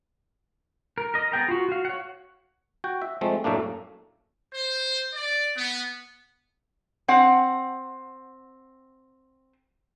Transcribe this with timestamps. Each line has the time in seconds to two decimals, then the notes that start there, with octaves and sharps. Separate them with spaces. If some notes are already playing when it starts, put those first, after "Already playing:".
0.98 A#4
1.14 A#4 D#5
1.32 B3 G#4 G5 A#5
1.48 F4 F#4
1.69 F#4 F5
1.85 C#5 F#5
2.84 F#4 G5
3.02 E5
3.21 F3 G#3 A3 C4
3.44 F#2 A2 A3 A#3 D4
4.54 C5
5.15 D5
5.57 B3
7.08 C4 F#5